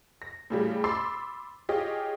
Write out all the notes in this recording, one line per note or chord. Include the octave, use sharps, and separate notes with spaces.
A#6
A2 C#3 G3 A3
B5 C6 D6 E6 A6 C7
F4 G4 G#4 C#5 D#5